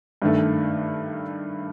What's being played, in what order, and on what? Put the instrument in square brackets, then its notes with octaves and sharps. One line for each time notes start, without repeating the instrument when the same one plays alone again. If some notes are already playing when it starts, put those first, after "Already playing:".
[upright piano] G2 D#3 A3